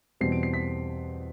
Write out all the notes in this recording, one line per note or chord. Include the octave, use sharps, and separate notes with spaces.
E2 B2 G3 C4 C7
D7
C7
B6